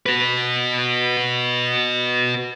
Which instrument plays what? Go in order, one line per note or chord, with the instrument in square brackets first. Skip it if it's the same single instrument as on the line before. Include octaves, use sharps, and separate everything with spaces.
[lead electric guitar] F#4 B4